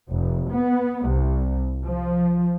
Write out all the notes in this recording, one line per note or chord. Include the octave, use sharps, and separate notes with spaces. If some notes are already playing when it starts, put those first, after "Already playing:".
F1
B3
C2
F3